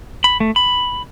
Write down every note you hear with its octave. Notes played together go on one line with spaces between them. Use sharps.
B5
A3
B5